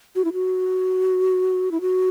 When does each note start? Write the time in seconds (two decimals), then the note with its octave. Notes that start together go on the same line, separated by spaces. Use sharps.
0.15 F#4
0.25 E4
0.33 F#4
1.71 E4
1.81 F#4